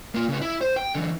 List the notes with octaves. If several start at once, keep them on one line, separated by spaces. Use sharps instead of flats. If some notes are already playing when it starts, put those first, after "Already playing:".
A#3 F4
C#3 B4
E4
C5
G5
D3 E3